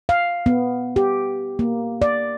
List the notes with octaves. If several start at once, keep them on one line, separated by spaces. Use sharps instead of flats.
F5
B3
G4
A#3
D5